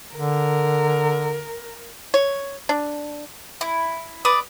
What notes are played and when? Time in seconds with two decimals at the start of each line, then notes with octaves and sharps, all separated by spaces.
0.15 D3 A#4
2.14 C#5
2.69 D4
3.61 E4
4.25 B4 D5 D#6